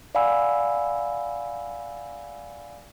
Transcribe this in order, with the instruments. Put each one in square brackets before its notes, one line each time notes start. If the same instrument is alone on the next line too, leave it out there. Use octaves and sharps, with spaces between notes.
[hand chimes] D5 F5 F#5 G#5 B5 E6